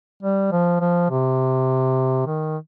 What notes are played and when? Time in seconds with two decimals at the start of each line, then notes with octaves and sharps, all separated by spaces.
0.23 G3
0.52 F3
0.81 F3
1.10 C3
2.27 D#3